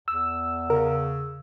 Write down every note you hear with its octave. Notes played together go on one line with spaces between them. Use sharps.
E2 E6
C#3 A#4